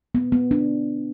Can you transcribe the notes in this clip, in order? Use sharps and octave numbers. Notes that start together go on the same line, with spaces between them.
B3
B3
D4